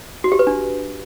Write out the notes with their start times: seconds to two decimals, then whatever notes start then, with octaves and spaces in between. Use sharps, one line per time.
0.24 F#4
0.32 G4
0.39 B4
0.47 D4